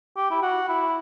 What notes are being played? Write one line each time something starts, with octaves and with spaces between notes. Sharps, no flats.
G4
E4
F#4
E4